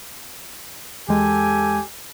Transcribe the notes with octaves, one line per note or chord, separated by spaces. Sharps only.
E2 G#3 G4 A4 G#5